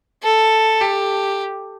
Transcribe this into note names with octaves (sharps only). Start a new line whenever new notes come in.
A4
G4